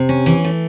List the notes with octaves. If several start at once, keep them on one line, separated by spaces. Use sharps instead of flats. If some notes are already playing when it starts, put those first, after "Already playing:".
Already playing: C3
C#4
E3
A3